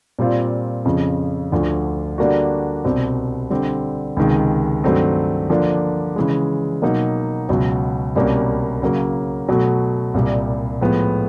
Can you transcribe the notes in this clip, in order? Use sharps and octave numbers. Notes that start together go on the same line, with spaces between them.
A#2 G3 C4 F4
F2 C#3 F3
D2 D3 F3
D3 G3 A#3 D4 F#4
C2 B2 G3 C4
D3 G3 C4
C#2 C3 D#3 G#3
G2 D#3 F#3 A3 C4
D3 F3 A#3 D4
C#3 E3 G#3
B2 F#3 A#3 D#4
C#2 B2 F#3
C2 B2 G3 A#3 C#4
C#3 F#3 A#3
B2 F#3 A3
C2 A#2 G3
A2 F3 G#3 B3